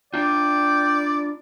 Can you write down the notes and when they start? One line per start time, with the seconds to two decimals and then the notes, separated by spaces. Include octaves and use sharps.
0.14 D4 F4 D5 G5